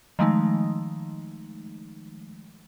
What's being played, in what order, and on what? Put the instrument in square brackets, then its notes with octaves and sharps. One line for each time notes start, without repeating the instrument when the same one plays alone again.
[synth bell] D#3 F3 G#3 A3 D#4